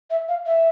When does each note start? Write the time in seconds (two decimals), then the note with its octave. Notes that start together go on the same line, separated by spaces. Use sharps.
0.10 E5
0.29 F5
0.46 E5